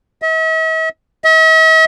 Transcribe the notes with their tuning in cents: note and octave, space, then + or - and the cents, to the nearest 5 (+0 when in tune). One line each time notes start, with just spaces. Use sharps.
E5 -45
E5 -45